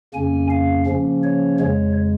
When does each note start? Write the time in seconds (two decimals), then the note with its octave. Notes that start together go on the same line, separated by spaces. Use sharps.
0.14 F2 C#3 A#3 C#4 G#5
0.50 F5
0.87 C#3 F3 A#3 C#4
1.23 C#5
1.60 F2 C#3 G#3 C#5